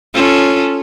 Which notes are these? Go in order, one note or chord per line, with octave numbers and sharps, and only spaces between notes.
C#4 F4 A4